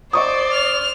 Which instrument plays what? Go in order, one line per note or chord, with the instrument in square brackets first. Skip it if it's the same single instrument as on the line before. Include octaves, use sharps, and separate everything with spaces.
[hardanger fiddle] C5 [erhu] D5 [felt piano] D#5 C#6 D#6
[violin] F6